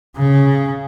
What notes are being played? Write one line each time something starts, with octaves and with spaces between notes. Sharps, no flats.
C#3